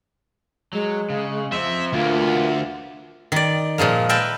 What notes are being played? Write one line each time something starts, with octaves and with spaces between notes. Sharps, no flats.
F#3 G#3
C#3
F3 C4 E5
D2 A#3 B3 F4
D#3 D5
A#2 F3 G#3 A#3
A#4 B4 E5 G5 A5